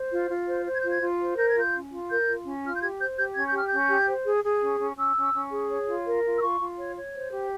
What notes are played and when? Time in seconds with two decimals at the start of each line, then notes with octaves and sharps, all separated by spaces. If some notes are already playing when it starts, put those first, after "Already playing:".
Already playing: C5
0.12 F4
0.30 F4
0.48 C5
0.66 C5
0.74 G#6
0.81 F4 G6
0.89 G#6
1.02 F4
1.20 C5
1.37 A#4 G6
1.48 G#6
1.56 F4 G6
1.73 C#4
1.91 F4
2.10 A#4 G6
2.27 F4
2.45 C#4
2.64 F4 F6
2.74 G6
2.81 G4 G#6
2.99 C5 G6
3.17 G4 G6
3.35 C#4 G#6
3.46 G6
3.53 G4 F6
3.67 C#4 G6
3.89 G4
4.07 C5
4.26 G#4
4.44 G#4
4.61 C#4
4.80 C#4
4.97 C#4 E6
5.16 C#4
5.34 C#4
5.51 G#4
5.70 C#5
5.87 F4
6.05 A#4
6.24 F4
6.37 E6
6.42 F4 C#6
6.60 F4
6.78 C#5
6.96 C#5
7.14 C5
7.31 G4